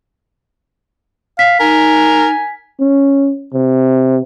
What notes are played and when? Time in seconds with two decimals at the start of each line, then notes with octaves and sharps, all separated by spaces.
1.39 F5 B6
1.60 D#4 A#4 G#5
2.80 C#4
3.54 C3